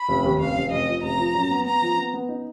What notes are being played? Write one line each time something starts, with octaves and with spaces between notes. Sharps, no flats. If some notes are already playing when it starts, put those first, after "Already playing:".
Already playing: B5
F1
D#2
F1 F5
F1
F1 D#5
F3
F1 A#5
F3
F#2
B3
B3 A#5
F3
B3
B3
D#4